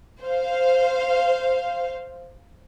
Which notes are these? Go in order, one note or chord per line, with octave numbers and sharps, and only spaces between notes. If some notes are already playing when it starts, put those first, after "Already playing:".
C5 F5